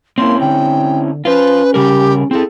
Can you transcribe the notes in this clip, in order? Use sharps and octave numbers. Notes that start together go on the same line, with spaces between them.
A#3 C4 C#4 E4 C6
D3 G5
C#4 F4 B4 C5
C#3 G3 G4 A#4
C4 E4 G#4 A4